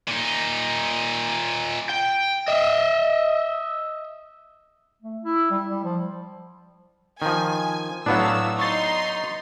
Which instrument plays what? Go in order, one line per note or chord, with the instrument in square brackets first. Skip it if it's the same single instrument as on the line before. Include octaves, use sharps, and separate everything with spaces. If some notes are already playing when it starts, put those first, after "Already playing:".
[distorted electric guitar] A#2 D#4
[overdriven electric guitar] G5
D#5 E5
[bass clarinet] A3
E4
G3
G3
F3
[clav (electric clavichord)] D#3 F3 [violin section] G#5
[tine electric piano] A2 F5 [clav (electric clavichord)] F#3 B3 D4 [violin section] A3 E6
[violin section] D#4 C6 [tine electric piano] C#6 A6